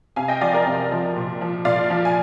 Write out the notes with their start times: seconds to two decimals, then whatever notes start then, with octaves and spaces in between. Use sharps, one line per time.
0.16 C3 F5 G#5
0.28 D#5 G5
0.41 F3 D5 F5
0.53 A#4 D5
0.66 C3
0.91 F3
1.16 A#2
1.41 F3
1.65 A#2 D5 F5
1.90 F3
2.05 G#5